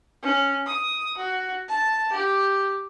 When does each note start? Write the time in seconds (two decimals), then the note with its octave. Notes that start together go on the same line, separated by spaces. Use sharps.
0.23 C#4
0.66 D#6
1.17 F#4
1.68 A5
2.12 G4